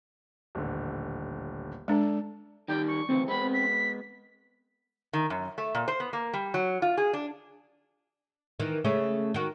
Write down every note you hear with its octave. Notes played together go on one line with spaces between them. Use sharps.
D#1 A1 D3
G#3 D4 A4 D5
D#3 G3 D5 G5
C#6
D2 C#3 E3 C4
G#3 B3 B5
B6
D#3
F#2
A3
A#2
C5
B3
A#3
G3
F#3
F4
G#4
D4
D#3 E3
C#3 A3 C#4
D#3 F#4